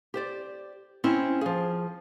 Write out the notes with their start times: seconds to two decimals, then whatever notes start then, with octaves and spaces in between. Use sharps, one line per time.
0.14 G4 C5 D5
1.04 C4 C#4 E4 C5
1.41 F3 G#4